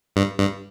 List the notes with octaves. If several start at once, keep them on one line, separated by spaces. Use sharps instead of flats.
G2
G2